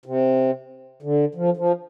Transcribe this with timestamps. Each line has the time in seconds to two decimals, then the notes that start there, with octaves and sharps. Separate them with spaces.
0.06 C3
1.03 D3
1.35 F3
1.57 F3